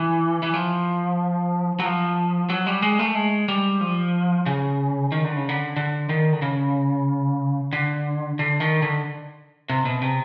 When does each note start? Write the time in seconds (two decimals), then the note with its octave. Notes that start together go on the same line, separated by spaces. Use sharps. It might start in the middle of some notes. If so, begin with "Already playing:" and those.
Already playing: E3
0.43 E3
0.54 F3
1.80 F#3
1.85 F3
2.50 F#3
2.66 G3
2.82 G#3
2.99 A3
3.15 G#3
3.48 G3
3.81 F3
4.46 C#3
5.12 D#3
5.24 D3
5.36 C#3
5.49 D3
5.77 D3
6.09 D#3
6.33 D3
6.42 C#3
7.73 D3
8.39 D3
8.60 D#3
8.82 D3
9.70 C3
9.85 B2
10.02 C3